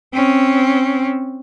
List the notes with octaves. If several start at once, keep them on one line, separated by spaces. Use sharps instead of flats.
C4 C#4